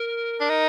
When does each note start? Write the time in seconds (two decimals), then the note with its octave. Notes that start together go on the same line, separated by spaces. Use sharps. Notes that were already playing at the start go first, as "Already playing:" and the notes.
Already playing: A#4
0.40 D4
0.50 D#4